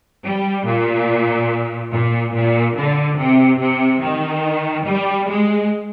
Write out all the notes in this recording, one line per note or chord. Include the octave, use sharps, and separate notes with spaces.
G3
A#2
A#2
A#2
D3
C3
C3
D#3
G3
G#3